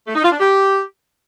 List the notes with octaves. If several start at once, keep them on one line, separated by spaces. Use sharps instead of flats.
A3
D#4
F4
D4
G4